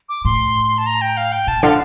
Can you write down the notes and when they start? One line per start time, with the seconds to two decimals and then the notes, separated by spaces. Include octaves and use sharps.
0.09 D6
0.25 A2 C6
0.78 A5
0.86 A#5
1.01 G5
1.17 F5
1.32 G5
1.47 A#2 A5
1.63 D3 F5